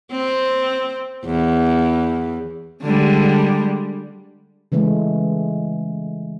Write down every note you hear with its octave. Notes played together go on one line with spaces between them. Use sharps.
C4
E2
D3 G3 G#3
C#3 E3 G#3 A3